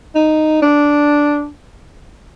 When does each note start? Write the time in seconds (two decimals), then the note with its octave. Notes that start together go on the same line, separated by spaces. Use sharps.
0.15 D#4
0.62 D4